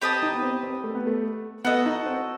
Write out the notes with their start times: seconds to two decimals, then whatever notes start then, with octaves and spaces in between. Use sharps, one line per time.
0.02 C4 G4 B4 D#5 A5
0.22 D#4
0.35 B3
0.43 C4
0.63 C4
0.84 A3
0.95 B3
1.07 A3
1.64 B3 F#4 A4 D#5
1.86 D#4
2.06 C4